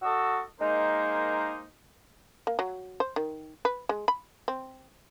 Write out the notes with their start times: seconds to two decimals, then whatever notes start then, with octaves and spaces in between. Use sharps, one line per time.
0.02 F#4 A4 D#5 C#6 E6
0.60 G#3 A#3 D#4 A#4 C5
2.47 A#3
2.59 F#3
3.00 C5
3.16 D#3
3.65 B4
3.89 G#3
4.08 B5
4.48 C4